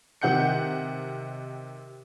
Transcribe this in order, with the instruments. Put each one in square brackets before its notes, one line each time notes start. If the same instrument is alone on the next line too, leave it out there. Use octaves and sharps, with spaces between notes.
[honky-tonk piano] C3 D#3 F#5 G6 C#7